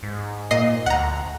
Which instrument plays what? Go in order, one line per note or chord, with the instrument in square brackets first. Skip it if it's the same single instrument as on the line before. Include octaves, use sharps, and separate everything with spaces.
[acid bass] G#2
[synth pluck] A#2 D#5 C7
[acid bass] D2 [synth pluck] F#5 A#5